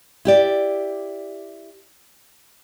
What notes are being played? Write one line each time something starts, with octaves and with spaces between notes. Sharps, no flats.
E4 G4 D5